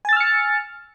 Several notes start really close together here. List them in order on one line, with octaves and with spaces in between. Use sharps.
G#5 A6 E6 F6 C#7